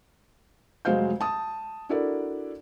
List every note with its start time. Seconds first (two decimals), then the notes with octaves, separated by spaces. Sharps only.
0.85 F1 F#3 G#3 C5 F5 G6
1.21 A5 D#6
1.89 D4 E4 F#4 A4 A#4 D5